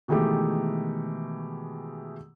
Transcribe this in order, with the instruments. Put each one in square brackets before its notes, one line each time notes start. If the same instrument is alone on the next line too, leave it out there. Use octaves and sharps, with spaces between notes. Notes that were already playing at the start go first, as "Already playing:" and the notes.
[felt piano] B2 D#3 E3 G#3 A3 G4